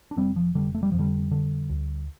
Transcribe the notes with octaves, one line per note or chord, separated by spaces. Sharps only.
D4
F1 G3 C4
F3
F1 D3 G3
A3
G3
F2 F3
D3 G3
D3
D2